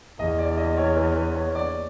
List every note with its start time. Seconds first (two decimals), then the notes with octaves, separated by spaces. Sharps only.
0.19 E2 D#5
0.38 D5
0.57 D#5
0.77 C#5
0.96 B4
1.16 B4
1.35 C#5
1.55 D5